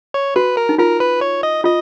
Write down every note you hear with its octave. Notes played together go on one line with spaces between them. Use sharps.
C#5
F#4 B4
A#4
D#4
F4 A#4
B4
C#5
D#5
F4 D#5